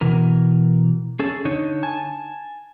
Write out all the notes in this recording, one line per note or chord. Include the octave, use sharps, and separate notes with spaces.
B2 E3 A#4
C#4 G#4 A4
D3 D#4 C#5
G#5 A5